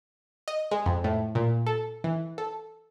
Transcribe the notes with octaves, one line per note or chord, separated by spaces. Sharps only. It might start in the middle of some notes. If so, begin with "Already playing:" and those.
D#5
G#3
F2
A2
A#2
A4
E3
A4